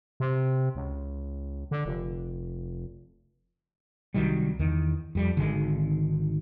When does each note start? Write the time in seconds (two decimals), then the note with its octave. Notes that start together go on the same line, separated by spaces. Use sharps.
0.20 C3
0.75 C#2
1.71 D3
1.86 F1
4.14 C2 D#3 F#3 G3
4.59 E2 D#3
5.15 F2 G3
5.37 G#1 D3 D#3 G#3